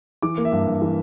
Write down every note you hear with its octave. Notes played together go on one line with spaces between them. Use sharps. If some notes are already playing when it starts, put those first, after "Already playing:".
E3 D6
A#3
E5
G2
G2
E3